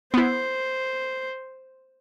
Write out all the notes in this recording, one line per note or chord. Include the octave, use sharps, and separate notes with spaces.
B3 E4 C5